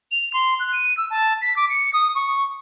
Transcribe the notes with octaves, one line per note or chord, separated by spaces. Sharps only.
F7
C6
F#6
D#7
E6
A5
B6
D6
C#7
D#6
C#6